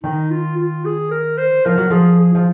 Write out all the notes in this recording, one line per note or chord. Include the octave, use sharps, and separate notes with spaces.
D#3 D#4
F4
F4
G#4
A#4
C5
F3 A#4
F#3
F3 G#4
G#4
F3